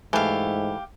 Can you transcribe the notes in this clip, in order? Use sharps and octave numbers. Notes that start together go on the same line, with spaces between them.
G#2 E3 A3 G4 F5